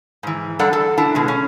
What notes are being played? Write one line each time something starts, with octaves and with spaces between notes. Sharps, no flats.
G#2 E3
G3 D4 A4 D5 F#5 A#5
A4
D4 E4 A5 A#5
B2 G#3
C#4